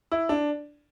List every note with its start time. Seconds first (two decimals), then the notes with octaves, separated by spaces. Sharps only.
0.11 E4
0.29 D4